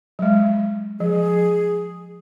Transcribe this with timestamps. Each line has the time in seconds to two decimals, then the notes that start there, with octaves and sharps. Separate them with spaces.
0.19 F#3 G#3
1.00 F3 G#4